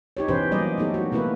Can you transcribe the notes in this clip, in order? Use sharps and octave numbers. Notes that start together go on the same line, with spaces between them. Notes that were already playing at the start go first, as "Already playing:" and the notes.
D#4 G4 C#5
B2 E3 C#4 G4 B4 C5
F#3 G3 A#3 D5 D#5
A3 B3 D#4 G4 A4
F#4
B2 A3 A#3 E4 B4